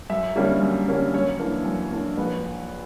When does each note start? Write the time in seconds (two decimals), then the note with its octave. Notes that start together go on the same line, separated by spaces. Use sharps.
0.10 F#2 E5
0.36 D3 G3 A#3 C#4
0.61 F#2
0.88 D3 G3 A#3 C#4
1.14 F#2 C#5
1.39 E3 A#3 D4
1.65 F#2
1.92 E3 A#3 D4
2.17 A#1 B4